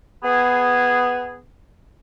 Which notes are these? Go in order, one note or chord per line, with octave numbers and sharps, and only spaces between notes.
B3 G#4